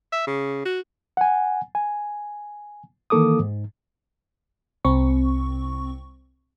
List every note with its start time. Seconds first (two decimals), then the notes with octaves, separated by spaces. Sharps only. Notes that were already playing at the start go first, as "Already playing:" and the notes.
0.12 E5
0.27 C#3
0.65 F#4
1.17 F#5 G#5
1.75 G#5
3.10 D#3 E3 A#3 A4 D6 D#6
3.40 G#2
4.85 C2 C4 C#6